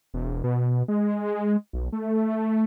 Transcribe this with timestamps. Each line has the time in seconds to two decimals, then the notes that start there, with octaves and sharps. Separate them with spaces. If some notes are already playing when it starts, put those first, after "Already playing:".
0.14 E1
0.44 B2
0.88 G#3
1.73 B1
1.92 A3